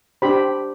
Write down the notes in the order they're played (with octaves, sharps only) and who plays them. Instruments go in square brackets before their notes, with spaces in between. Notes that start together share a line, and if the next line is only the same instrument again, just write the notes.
[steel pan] D4 G4 C5 B5